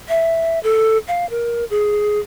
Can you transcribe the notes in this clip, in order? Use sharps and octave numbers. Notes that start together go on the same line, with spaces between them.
E5
A4
F5
A#4
G#4